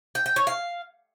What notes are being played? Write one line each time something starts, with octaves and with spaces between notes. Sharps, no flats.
G5
G5
C#5
F5